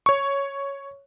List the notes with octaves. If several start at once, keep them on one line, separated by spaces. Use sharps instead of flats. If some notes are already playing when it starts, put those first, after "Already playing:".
C#5 C#6